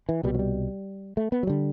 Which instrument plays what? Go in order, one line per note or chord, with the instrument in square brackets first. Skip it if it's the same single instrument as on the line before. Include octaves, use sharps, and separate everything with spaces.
[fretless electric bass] E3
C2 B2 G3
F#3
G3
A3
B3
F#3
D3 G3